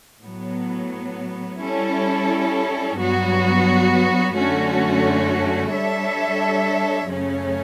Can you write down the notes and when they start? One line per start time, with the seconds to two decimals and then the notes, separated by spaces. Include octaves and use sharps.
0.23 A2 F#3 B3
1.61 G3 C#4 E4 A4
2.98 G2 F#3 B3 F#4
4.36 F#2 D3 A3 C#4 F#4
5.73 G3 D4 A4 C#5 E5
7.11 F#2 C#3 F#3 A3 C#4